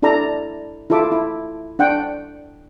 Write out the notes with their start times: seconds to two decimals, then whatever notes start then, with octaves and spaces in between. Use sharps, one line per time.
0.02 D4 E4 A4 D5 A#5
0.90 E4 F4 A4 E5 D6
1.12 E4
1.79 D4 F#5 G5